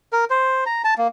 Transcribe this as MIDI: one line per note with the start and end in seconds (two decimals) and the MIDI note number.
0.13 0.25 70
0.30 0.64 72
0.66 0.82 82
0.84 0.94 81
0.98 1.08 58